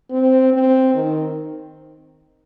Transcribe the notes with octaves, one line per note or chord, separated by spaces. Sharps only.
C4
C4
D#3